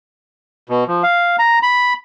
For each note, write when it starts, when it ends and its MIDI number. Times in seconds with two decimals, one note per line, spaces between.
0.69 0.84 47
0.88 1.03 53
1.03 1.36 77
1.39 1.59 82
1.63 1.93 83